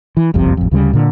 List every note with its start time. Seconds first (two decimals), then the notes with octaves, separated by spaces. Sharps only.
0.17 E3
0.34 F#1 C2 F2 C3
0.57 A1 F2
0.71 D2 C#3 G3
0.93 A#2 D3